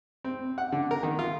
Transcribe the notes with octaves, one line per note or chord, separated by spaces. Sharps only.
C4
F#5
D3
A#4
D#3
F4